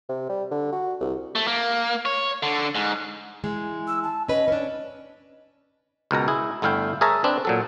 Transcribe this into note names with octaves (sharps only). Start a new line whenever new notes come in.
C3
G3
D3
F#4
C2
A3
A#3
C#5
D3
G#2
E3 G#3
E6
A5
C#4 B4 D#5
C#4 D4
C#2 B2 A#4 A#5
E4 G#4
G1 A3 E4 F5 G5
G#4 A#4 C#5 E5 A5 A#5
C4 D4 B4
A#2 F#3 A4